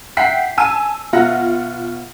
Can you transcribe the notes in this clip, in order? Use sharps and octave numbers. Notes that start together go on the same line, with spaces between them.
E5 F#5 G5 B6 C7
G#5 A5 E6 D#7
B2 F4 E5 F#5 A#6